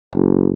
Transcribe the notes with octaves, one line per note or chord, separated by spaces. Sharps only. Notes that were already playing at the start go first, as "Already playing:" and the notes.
F#1